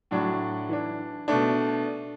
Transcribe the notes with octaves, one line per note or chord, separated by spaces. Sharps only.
A2 F#3 D4
E3 D4
B2 A3 D4